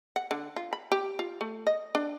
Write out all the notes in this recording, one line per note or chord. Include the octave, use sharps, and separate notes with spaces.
F#5
D3
F4
B5
G4
F4
A3
D#5
D4